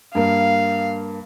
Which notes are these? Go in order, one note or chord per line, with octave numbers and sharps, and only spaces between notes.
G2 A#3 F5